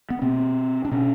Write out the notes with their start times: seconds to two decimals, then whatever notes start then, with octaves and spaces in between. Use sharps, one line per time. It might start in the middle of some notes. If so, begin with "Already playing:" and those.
0.10 B3
0.22 B2 C4
0.85 D4
0.91 B2 C#4